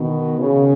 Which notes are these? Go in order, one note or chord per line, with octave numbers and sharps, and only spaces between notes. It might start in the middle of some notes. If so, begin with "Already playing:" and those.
Already playing: B2 D#3
C#3